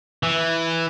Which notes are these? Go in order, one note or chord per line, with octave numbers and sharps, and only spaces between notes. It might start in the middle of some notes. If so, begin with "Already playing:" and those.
E3